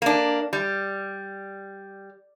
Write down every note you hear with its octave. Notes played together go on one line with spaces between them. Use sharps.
A#3 D4
G3